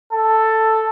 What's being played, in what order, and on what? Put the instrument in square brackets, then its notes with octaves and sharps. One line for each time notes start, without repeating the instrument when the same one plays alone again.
[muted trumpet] A4